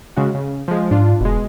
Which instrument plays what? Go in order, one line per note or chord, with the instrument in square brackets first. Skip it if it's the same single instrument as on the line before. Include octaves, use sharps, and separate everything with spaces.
[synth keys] C#3 G#3 F#4
C#3
F3 G#3
[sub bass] G#2 [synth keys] D4 F4
[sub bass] F1 [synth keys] B2 G#3